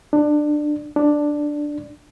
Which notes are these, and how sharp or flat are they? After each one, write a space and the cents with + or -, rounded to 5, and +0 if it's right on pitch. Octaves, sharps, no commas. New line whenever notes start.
D4 +20
D4 +5